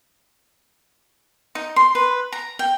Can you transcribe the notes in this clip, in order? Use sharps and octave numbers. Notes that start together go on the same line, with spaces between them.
D#4
C6
B4
A#5
G5